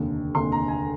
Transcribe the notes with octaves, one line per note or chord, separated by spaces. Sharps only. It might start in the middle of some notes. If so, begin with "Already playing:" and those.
Already playing: F1 D#2 D3
F1 D#2 D3 C6
A#5
G#5